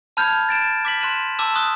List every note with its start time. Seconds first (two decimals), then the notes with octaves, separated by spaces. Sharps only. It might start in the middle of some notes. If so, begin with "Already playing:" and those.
0.17 A5 B5 F6 G6 G#6
0.49 A6 D7 E7
0.85 D6 B6 F#7
1.01 C6 F#6 D#7 E7 F#7
1.39 A5 D6 E6 E7
1.55 C6 D#6 F6 F#6 G7